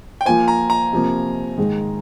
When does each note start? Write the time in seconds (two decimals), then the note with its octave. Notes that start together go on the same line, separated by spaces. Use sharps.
0.21 G5
0.26 F3 A#3 F4 C5 G#5
0.48 A#5
0.70 A#5
0.93 C3 F3 A#3
1.57 G#2 D#3 G#3